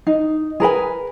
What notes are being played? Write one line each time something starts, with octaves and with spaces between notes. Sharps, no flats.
D#4
G#4 A#4 B4 G#5